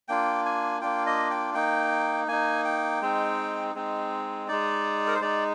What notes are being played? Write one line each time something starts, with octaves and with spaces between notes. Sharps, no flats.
A#3 D4 F4 G5
G#5
A#3 D4 F4 G5
D#5
G5
A#3 D#4 G5
A#3 D#4 G#5
G5
G#3 C4 D#4
G#3 C4 D#4
G#3 D#4 D5
A#4
C5
G#3 D#4 D5